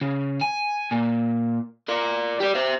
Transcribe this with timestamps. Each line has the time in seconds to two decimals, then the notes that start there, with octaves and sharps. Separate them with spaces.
0.01 C#3
0.41 G#5
0.91 A#2
1.89 A#4 D5
2.40 G4 D5
2.55 C5 E5